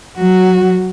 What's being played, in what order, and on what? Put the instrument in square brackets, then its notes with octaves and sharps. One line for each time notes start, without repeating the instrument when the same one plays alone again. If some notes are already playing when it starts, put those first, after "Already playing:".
[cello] F#3 F#4